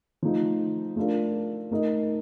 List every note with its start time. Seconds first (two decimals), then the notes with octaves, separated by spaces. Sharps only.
0.23 F3 A3 D#4
0.96 A3 D4 F4 A#4
1.71 A3 D#4 A#4 D#5